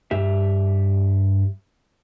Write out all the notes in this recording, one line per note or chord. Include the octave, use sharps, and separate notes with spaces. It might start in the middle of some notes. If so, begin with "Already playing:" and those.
G2 G4 E5